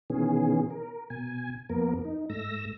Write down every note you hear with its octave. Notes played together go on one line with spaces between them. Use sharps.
B2 D#3 E3 B3 C#4 G#4
A#4
B2 G#5
F2 A#3 B3 A#4
D#4
G#2 A3 E6 A#6